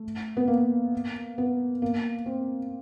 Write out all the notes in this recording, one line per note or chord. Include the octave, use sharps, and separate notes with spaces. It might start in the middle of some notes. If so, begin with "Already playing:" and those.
Already playing: A3
B3
A#3
B3
A#3
C4